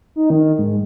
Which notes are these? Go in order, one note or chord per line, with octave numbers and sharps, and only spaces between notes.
D#4
D#3
G#2